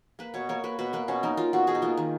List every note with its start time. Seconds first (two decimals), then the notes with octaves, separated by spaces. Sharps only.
0.19 A#3 B4
0.34 B2 C#5
0.49 A#3 C#5
0.64 A#3 B4
0.79 B2 B4
0.93 A#3 B4
1.08 B2 C#4
1.23 A#3 D#4
1.37 A#3 F4
1.53 B2 F#4
1.67 B2 G#4
1.75 D#4
1.82 A#3 F4
1.97 D#3